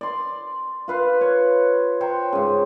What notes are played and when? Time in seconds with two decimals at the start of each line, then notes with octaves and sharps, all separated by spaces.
0.01 D5 C6
0.88 F4 B4 F5
1.21 C#5
2.01 C5 C#5 G5 A#5
2.33 G#2 C#3